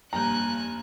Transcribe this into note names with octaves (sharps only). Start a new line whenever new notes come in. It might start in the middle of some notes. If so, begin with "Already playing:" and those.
F1 G2 A#3 G#5 A#5 F#6 G6